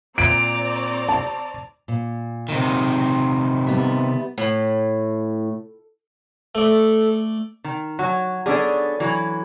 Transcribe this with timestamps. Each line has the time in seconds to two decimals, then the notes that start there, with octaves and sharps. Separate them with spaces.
0.18 A#2 C4 D5 A#5 D7
1.09 A5
1.88 A#2
2.49 C3 D#3
3.67 G3 B3 E5
4.38 A2
6.55 A3 A4 D5
7.64 D#3
7.99 F#3 F#4 G#5
8.46 B3 C#4 D4 G#4 A4 D5
9.00 E3 F#3